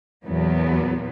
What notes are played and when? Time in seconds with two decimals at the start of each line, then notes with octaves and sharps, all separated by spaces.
0.25 E2 A#2 F#3 B3